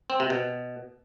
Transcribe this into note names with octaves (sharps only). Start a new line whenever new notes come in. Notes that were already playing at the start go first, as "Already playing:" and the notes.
C4
C3
B2